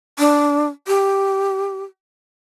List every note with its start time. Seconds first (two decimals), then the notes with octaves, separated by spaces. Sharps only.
0.19 D4
0.87 G4